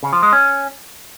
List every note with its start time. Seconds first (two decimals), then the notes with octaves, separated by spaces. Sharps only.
0.03 C#3
0.13 F3
0.23 G#3
0.32 C#4